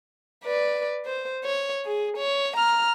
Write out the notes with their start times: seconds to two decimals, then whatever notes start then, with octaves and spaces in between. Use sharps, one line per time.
0.45 B4 D5
1.05 C5
1.45 C#5
1.86 G#4
2.18 C#5
2.57 A#5 F6